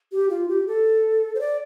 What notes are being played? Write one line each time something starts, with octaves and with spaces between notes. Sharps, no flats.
G4
F4
G4
A4
C5
D5